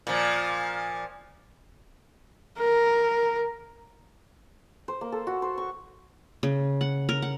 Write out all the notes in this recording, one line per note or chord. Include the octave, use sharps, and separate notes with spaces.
A#2 F3
A#4
C5
A#3
A4
F#4
C5
C#6
C#3
F#5
A#4
F#5